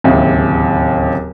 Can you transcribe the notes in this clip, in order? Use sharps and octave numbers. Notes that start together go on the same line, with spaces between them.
D1 D#2 C#3 E5